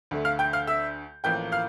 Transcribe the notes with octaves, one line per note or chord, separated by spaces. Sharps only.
D2 D3 A3
F5 F6
G5 G6
F5 F6
E5 E6
A1 A2 F3 A#3 G5 G6
F5 F6